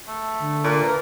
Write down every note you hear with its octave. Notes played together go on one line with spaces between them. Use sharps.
A3
D3
A#2
A#4 B4